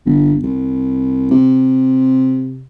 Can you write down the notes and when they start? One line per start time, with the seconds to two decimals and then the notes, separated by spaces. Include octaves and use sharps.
0.06 G1
0.43 C2
1.31 C3